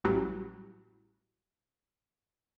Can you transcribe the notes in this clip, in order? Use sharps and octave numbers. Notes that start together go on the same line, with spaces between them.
A1 E3 F#3 G3